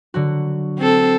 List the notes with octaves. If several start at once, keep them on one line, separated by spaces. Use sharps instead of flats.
D3 F#3 F#4
C4 A4